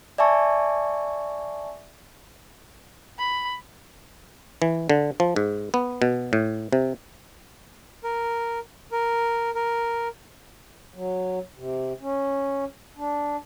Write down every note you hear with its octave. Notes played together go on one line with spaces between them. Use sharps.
D5 E5 G#5 A5 C#6
B5
E3
D3
F3
G#2
B3
B2
A2
C3
A#4
A#4
A#4
F#3
C3
C#4
D4